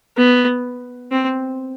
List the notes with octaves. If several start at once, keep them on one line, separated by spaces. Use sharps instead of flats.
B3
C4